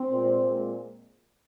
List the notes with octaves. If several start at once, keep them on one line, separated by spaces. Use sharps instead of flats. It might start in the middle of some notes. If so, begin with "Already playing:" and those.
Already playing: C4
A#2 G#3
A#2 G#3